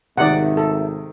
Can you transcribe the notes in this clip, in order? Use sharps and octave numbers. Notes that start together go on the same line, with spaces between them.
G#1 C3 D#3 D5 E5 F#5
A4